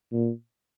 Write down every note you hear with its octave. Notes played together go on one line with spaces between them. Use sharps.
A#2